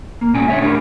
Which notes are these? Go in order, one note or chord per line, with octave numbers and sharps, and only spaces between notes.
A#3
A#2 G#3 C#4 G5 G#5
D3 C#5 E5
A3 D4 G4 A#4 B4